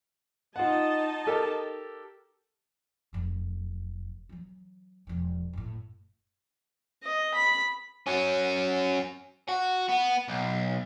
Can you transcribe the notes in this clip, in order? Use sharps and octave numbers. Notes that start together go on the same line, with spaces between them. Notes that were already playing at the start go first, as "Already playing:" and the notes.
D#4 F4 D#5 F#5 A5
G4 A4 A#4
F1 F#2
E3 F#3
E1 F3
F#1 A2
D#5
B5
F#3 C#4
F#4
B3
B1